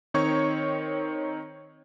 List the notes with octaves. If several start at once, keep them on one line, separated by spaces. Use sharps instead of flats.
D#3 C4 D#4 C#5 C#6 G#6